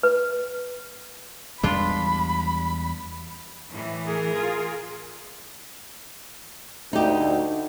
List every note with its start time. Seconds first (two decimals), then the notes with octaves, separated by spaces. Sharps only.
0.03 B4
1.63 E2 G3 G#3 D4 F4 B5
3.70 A2 E3
4.05 G#4 A#4
4.35 F4
6.93 D2 D#4 G4